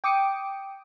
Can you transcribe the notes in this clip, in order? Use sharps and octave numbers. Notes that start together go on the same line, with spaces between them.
G5 D6 D#6 C#7